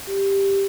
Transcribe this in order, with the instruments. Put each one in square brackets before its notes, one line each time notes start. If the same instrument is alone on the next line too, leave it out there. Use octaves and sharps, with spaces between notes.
[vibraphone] G4